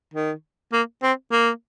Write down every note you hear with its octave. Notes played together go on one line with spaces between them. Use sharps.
D#3
A#3
C4
A#3